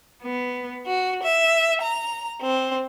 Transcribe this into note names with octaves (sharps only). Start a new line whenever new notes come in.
B3
F#4
E5
A#5
C4